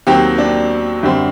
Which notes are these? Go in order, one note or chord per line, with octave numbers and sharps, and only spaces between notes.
D#2 D#3 F#3 C4 G4
D4
F#2 D3 G3 C4